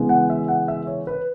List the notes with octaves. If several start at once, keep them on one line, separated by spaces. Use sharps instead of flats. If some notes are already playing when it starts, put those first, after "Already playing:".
Already playing: C#3 E3 G#3 B3
F#5
E5
F#5
E5
C#5
B4